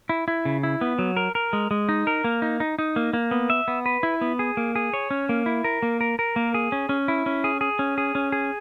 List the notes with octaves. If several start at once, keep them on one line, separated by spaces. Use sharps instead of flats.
E4
E4
C#3
E4
B3
F#3
A#4
A#4
G#3
G#3
D#4
A#4
A#3
D#4
D#4
D#4
A#3
A#3
B3
E5
B3
B4
E4
B3
G#4
A#3
G#4
C#5
C#4
A#3
E4
A#4
A#3
A#4
A#4
A#3
G#4
C#4
C#4
E4
C#4
G#4
G#4
C#4
G#4
C#4
G#4